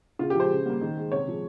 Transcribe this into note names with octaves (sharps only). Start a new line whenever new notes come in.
C#3 F4
G4
F3 G#3 C5
C#3
G3 A#3
D#3
G#3
C3 C#5
F3 G#3